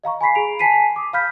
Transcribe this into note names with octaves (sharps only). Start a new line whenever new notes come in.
D#5 F5 A#5 C#6
G#5 B5 B6 C7
G#4 A#5 D7 F7
G#5 A5 B6 C7 D#7
D6 D#6
F5 B5 F6 G6 B6